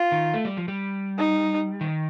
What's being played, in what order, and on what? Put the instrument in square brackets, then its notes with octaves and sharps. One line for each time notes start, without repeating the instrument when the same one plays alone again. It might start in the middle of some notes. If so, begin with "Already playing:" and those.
Already playing: [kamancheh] F4
[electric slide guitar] D#3
A3
G3
F3
G3
[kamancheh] D#4
[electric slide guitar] D#3